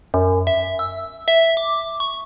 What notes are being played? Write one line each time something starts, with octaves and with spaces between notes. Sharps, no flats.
F#2
E5
E6
E5
D6
C#6